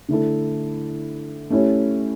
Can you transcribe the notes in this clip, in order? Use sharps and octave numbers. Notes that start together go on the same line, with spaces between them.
D3 A3 E4 A4
A3 C#4 E4 G4 C#5